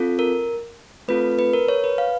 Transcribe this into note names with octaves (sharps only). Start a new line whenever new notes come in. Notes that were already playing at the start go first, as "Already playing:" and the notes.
Already playing: C4 F4 A4
A#4
A3 C4 F4 A4 B4
B4
A#4
C#5
B4
F5